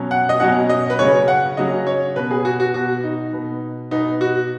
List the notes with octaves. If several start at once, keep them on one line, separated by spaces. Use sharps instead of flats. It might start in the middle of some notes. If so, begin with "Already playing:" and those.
Already playing: B2 F#3 C#4
F#5
D#5
B2 F#3 C#4 F#5
D#5
B4
C#3 F#3 C#4 C#5
F#5
C#3 F#3 C#4 D#5
C#5
B2 B3 B4
G#4
F#4
F#4
B2 B3 F#4
D#4
B2 B3
B2 B3 D#4
F#4